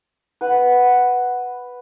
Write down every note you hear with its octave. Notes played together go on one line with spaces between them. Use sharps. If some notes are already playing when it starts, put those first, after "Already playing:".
B4 F#5